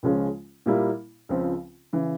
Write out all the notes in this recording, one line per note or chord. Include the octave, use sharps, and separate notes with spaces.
C#2 C#3 F3 G#3 C#4
A#2 G3 A#3 E4
C#2 C#3 F3 C4
C#3 E3